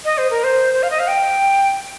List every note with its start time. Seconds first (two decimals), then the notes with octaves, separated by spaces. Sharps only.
0.05 D#5
0.18 C5
0.30 A#4
0.44 C5
0.74 C5
0.83 F5
0.91 D#5
1.00 F5
1.08 G5